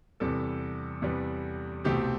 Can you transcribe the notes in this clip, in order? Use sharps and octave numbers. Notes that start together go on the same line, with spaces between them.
E2 C3 G3 B3 A4
E2 C3 G3 B3
C2 B2 A3 C4 G4